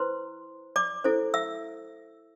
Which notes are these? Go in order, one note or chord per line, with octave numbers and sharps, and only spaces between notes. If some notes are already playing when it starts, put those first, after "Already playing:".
Already playing: E4 B4 C5 C6
D5 D6
E4 A4 C5
E5 E6